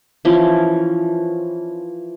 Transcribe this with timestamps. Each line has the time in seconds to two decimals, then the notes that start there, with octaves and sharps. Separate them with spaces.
0.25 E3 F3 C#4